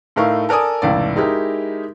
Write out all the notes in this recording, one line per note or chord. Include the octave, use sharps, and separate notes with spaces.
A2 A3 D#4 A#4 F5 C#6
A4 A#4 D5 G#5 D#6
F1 C#2 A2 D5
G#3 D#4 E4 G4 A#4